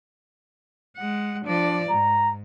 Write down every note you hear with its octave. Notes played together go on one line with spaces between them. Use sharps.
G#3 F#5
F3 D4 D5
G#2 A#5